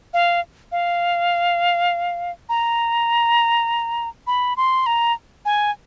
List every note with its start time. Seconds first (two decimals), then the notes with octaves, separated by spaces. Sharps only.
0.14 F5
0.72 F5
2.49 A#5
4.27 B5
4.57 C6
4.86 A#5
5.45 G#5